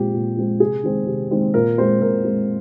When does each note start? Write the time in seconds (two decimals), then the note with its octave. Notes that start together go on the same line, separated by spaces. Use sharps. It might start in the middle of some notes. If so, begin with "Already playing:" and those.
Already playing: A#2 F3 G#3 C4 G4
0.14 A#2
0.37 F3 G#3 C4
0.60 C3 G#4
0.83 D#3 G#3 C4
1.07 C3
1.31 D#3 G#3 C4
1.54 A#2 A#4
1.78 G#3 C4 C5
2.02 A#2 A#4
2.24 G#3 C4